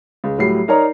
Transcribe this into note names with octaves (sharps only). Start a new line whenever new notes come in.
C#2
A2 F#3 G3 C7
D#4 A#4 C#5 D5 A#5